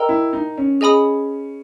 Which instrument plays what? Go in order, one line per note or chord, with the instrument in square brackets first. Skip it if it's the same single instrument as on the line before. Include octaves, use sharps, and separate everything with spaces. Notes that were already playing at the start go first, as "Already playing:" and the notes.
Already playing: [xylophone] A#4 D#5 G5 A#5 E6
[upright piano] E4
D#4
C#4
[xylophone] G#4 D#5 G#5 B5 D#6